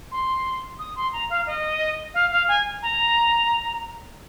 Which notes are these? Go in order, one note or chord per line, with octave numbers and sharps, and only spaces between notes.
C6
D#6
C6
A#5
F5
D#5
F5
F5
G#5
A#5